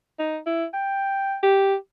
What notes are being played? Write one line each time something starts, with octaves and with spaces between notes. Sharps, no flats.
D#4
E4
G5
G4